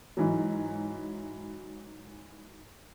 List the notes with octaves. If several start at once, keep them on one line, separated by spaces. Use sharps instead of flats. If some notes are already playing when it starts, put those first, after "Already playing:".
G#2 E3 F#3